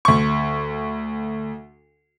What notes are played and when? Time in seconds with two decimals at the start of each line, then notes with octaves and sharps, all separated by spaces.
0.05 D2 C#6